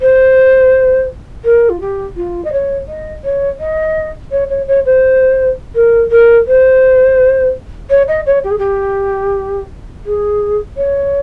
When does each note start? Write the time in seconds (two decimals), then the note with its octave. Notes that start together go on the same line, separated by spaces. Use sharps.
0.01 C5
1.45 A#4
1.69 F4
1.80 G4
2.16 F4
2.45 D#5
2.52 C#5
2.88 D#5
3.24 C#5
3.60 D#5
4.31 C#5
4.50 C#5
4.67 C#5
4.86 C5
5.75 A#4
6.11 A#4
6.47 C5
7.90 C#5
8.08 D#5
8.26 C#5
8.44 G4
8.51 G#4
8.58 G4
10.06 G#4
10.77 C#5